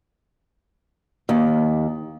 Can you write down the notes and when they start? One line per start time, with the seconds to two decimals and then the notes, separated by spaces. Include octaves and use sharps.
1.29 D#2